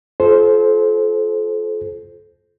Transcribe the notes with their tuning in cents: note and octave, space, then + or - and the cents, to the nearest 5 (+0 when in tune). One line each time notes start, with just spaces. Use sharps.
F4 +0 A4 -35 C5 +0